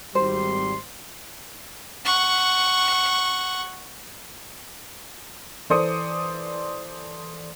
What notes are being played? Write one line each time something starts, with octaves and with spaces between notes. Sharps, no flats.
G#1 G3 C5 C6
F#5 C#6
E3 A4 C5 D5 D#6 C#7